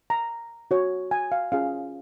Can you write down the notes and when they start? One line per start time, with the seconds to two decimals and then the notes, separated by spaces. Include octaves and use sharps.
0.10 A#5
0.71 F#4 C#5
1.11 G#5
1.32 F5
1.52 C#4 F4 G#4 F5